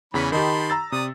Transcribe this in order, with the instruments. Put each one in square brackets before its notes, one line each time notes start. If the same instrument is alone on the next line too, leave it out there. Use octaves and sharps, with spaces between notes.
[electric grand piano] E2 C#3 B6 [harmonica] E3 C#4 B5
[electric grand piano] D#3 D#4 G4 [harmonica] A5 B5 C6
[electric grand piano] A#5 E6 A6
[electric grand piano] C3 [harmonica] D5 D#6